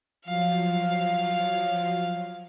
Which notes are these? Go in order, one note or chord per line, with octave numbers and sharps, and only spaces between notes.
F3 F#3 F5